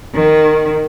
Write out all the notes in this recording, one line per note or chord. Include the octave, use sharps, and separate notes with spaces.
D#3